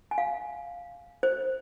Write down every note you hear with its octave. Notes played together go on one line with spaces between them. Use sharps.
G#5
F5
C5